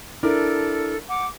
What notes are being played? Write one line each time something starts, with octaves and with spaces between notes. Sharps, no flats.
D4 E4 A4 A#4
F#5 D6